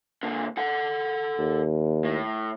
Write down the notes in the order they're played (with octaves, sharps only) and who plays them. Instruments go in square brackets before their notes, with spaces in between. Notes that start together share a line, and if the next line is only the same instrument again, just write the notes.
[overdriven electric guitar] A#2 D3
A4 F#5
[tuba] D#2
[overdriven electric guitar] A2